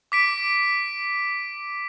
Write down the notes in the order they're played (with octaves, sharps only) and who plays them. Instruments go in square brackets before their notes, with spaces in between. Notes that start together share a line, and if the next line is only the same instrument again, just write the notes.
[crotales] D6 B6 D7